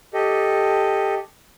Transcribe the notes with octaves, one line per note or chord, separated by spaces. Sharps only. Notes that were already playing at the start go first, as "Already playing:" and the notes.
G4 A4 D#5